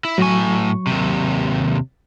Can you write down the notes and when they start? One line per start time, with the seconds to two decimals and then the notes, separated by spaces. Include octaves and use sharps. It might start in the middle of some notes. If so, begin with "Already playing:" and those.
0.05 E4
0.18 A2 F#3 G#5 C#6
0.87 D#2 C3